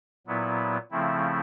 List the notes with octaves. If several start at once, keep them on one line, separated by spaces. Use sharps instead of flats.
A#2 F#3 B3 E4
C#3 F3 A3 C4 E4